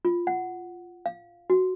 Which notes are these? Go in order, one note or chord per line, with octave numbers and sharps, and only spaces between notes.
F4
F#5
F5
F#4